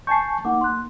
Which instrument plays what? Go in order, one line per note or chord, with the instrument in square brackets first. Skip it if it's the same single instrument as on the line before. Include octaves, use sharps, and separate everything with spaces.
[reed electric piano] G#5 A5 C#6 [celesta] G6 C7
[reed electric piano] A#3 [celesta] D#4 F#5 D6
[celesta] C6 F#6